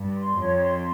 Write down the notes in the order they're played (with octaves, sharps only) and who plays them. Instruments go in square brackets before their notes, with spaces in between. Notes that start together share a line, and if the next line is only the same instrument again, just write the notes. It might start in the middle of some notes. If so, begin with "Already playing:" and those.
Already playing: [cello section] G2
[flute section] C6
[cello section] F2 [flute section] C#5
[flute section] C6